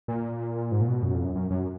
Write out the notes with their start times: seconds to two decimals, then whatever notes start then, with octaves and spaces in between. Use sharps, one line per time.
0.08 A#2
0.72 G#2
0.81 A#2
0.88 B2
1.03 F#2
1.14 F2
1.25 F#2
1.35 F#2
1.51 F#2